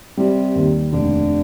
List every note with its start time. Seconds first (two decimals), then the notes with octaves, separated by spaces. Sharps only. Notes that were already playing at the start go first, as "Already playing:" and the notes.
0.17 C3 G3
0.55 D#2
0.92 F1 D3